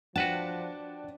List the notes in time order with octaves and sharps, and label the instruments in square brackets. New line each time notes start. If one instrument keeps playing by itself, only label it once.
[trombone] F3 [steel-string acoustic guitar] D4 [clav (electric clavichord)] F#4 B4 A5 [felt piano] F#5 G5 E7